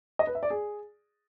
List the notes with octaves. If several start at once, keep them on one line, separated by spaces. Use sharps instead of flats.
D#5
B4
E5
D5
G#4